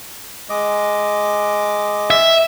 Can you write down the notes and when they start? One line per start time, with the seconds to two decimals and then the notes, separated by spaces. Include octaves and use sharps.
0.50 G#3 D#5 D6
2.10 E5